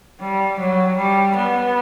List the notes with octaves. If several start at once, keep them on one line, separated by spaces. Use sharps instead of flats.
G3
F#3
G3
B3